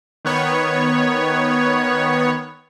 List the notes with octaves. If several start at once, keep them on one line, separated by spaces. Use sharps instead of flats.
D#3 B3 C#5